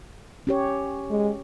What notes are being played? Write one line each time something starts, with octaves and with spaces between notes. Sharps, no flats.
C#4 G4 C#5
G#3